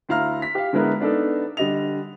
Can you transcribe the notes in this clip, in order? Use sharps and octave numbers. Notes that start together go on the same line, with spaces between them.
D2 E4 F5 A#5 F6
B6
G4 F5
D3 G#3 B3 E4 A#4 B4
B3 D4 D#4 A4
D3 G3 D#5 F7